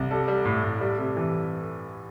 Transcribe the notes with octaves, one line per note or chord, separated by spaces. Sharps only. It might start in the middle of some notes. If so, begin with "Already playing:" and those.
Already playing: C2
G3 A4
G3
A2
A2
G3
C3
E3